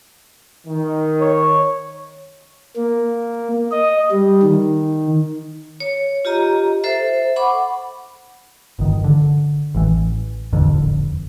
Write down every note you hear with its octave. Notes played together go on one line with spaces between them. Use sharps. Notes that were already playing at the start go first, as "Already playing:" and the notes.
D#3
C#5
A#3
D#5
G3
D#3
C#5
F4 G4 D#5 A#5
A4 C5 E5
F#5 B5 C#6 D6
G1 D#3
D3
A1 E3
D#1 A1 F2 D3